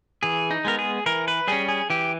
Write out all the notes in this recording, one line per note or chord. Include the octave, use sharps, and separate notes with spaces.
E3 G#4
D#4
G#3 B3 A#4
G#4
E3 A#4
B4
G3 C#4 G#4
G#4
E3 G4